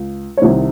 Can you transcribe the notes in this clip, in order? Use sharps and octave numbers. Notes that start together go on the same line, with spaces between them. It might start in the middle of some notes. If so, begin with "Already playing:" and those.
Already playing: C#2
C#5
C2 C3 D#3 C5